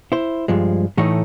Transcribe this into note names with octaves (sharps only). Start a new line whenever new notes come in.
E4 C5
G2 F3 G#3
A2 E3 A3 D#4 C#5 D#5